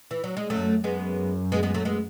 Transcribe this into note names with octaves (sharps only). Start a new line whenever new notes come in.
E3
F#3
G#3
F#2 F#3 A3
F#2 G#3 B3
G#3 B3
G#3 B3
F#3 A3
G#3 B3